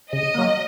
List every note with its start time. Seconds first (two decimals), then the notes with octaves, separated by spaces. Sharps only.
0.12 C#3 D#5
0.35 F#3 A#3